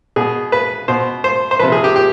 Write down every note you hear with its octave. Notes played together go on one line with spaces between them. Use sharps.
B2 G#4
B4
B2 C5
C5
C5
C3 F3 B4
G#4
G4
G4